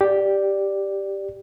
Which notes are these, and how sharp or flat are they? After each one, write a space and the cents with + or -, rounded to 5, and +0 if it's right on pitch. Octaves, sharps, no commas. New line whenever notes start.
G4 +0 D5 +0